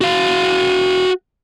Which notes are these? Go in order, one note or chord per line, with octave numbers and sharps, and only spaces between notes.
F#4 F5